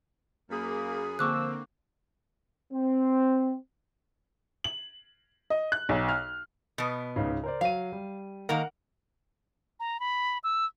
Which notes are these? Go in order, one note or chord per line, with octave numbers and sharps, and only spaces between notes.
F#2 A#3 G#4 B5
D3 F3 A#3 C4 C#6 D6 E6 F#6
C4
F#7
D#5
F#6
B1
F6
B2 B3
C#2 G#2 C#3
A#4 C5 D5
F#3 F5 D#7
G3
D#3 A#3 A#4 F#5
A#5
B5
E6